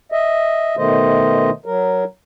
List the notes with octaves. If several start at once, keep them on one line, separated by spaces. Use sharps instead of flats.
D#5 E5
B2 D#3 A3 C5 D#5
F#3 A#4